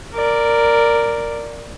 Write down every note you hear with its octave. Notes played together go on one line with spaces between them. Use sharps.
A#4 D5